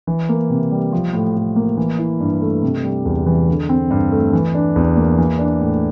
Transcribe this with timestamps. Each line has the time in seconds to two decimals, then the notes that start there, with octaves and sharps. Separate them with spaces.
0.07 E3
0.29 A#3
0.50 C3
0.71 G3
0.93 F3
1.13 A2
1.35 A2
1.56 A#3
1.77 E3
1.99 E4
2.20 G2
2.41 A3
2.63 C3
2.84 G3
3.05 E2
3.26 E3
3.47 D3
3.69 C4
3.90 G2
4.12 A3
4.33 E3
4.55 D4
4.76 E2
4.97 A#3
5.18 E3
5.39 D4
5.61 A2